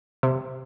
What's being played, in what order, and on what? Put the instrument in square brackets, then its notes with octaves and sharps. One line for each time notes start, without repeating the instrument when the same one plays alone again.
[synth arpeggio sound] C3